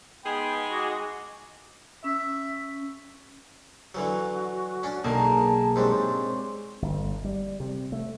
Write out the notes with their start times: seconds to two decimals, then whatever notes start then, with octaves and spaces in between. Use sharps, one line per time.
0.25 G#3 B3 D#4 G#4 G5 B5
0.71 F#4 D#5 D6
2.04 C#4 E5
3.95 D3 E3 F#3 F#4
4.83 C#4 D4
5.04 B1 D3 D#3 A#3 G#4 A#4 A5
5.76 G#2 C4 D4 G4 C#5
6.82 G1
7.25 G3
7.60 C3
7.92 A3